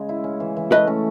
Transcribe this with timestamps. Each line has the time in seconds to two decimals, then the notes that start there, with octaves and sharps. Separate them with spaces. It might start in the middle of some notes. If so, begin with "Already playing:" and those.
Already playing: C#3 G#3
0.09 E4
0.24 C#4
0.40 E3
0.57 E3
0.71 A3 B4 D#5
0.87 C#4